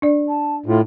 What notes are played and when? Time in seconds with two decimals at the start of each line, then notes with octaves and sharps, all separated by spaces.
0.02 D4 D5
0.28 A5
0.66 A2 F4